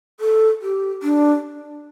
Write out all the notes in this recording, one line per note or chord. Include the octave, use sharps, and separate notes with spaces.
A4
G4
D4